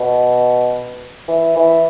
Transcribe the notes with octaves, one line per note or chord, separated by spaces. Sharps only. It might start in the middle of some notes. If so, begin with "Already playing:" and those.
Already playing: B2
E3
E3